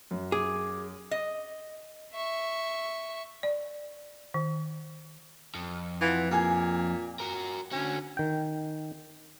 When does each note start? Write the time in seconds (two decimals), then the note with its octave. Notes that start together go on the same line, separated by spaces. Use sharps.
0.11 F#2
0.32 G#4 D6 G#6
1.11 D#5
2.13 E5 C#6
3.43 D5
4.34 D#3
5.55 F2
6.01 E3 F4 F#5
6.31 A#2 G4 G#4 G#5
7.20 F#4 A#4
7.72 D3 C#4 F#4
8.17 D#3 G5